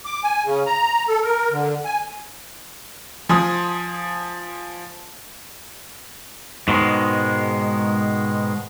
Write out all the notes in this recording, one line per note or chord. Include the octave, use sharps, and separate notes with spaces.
D6
G#5
C#3
A#5
A4
A#4
D3
G#5
F3 G#5 C6 D#6
G#2 B2 D#3 G#3